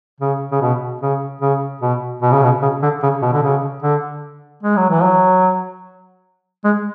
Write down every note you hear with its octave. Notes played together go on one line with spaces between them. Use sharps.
C#3
C#3
B2
C#3
C#3
B2
B2
C#3
B2
C#3
D3
C#3
B2
D3
C#3
D3
G#3
F#3
E3
F#3
G#3